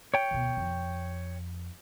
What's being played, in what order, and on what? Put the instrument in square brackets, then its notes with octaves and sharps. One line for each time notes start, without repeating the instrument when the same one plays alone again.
[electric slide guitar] C#5 G5
[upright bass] D2 B2
F2